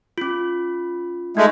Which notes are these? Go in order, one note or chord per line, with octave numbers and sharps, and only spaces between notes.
C#4 F4
G#3 A3 D#4